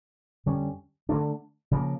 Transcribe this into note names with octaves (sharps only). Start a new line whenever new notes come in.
F2 D3 G3 C#4
D3 F3 A3 D4
C#3 F3 A#3